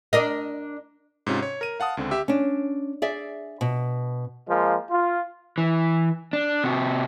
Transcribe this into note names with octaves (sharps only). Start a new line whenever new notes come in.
D4 A#4 D#5
G#2 C3 C#4 F4
C#5
A#4 D#7
F5 F#5 A5 D#6
C#2 D3 C4
G4 E5 E6
C#4 D4
G#4 D5 E5
B2
F3 G#3 A#3
F4
E3
D4
C3 F#4